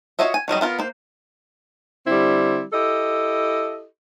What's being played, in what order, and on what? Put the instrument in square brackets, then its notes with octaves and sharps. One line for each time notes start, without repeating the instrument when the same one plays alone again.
[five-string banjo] F4 F#4 C#5 D#5 E5
G#5
D#3 F#3 G3 D#5
B3 F4 A#4
A#3 C5
[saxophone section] D3 G3 C4 E4
E4 G4 A4 D#5